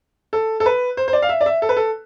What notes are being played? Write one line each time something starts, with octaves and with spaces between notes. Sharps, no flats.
A4
A4
B4
C5
C5
D5
F5
E5
D5
E5
A4
B4
A4